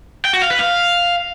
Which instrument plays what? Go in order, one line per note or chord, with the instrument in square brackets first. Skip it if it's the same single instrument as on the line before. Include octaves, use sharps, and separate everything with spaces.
[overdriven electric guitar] G5
F#4
F5
B4
F5